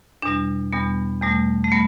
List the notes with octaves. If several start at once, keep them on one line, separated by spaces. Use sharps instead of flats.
E2 B2 G3 D4
E2 B2 G3 B3
E2 B2 G3 A3
A3
G3 B3